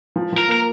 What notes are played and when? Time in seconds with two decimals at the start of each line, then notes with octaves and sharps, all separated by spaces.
0.16 F3
0.33 F3
0.38 A#4
0.48 A#3 A#4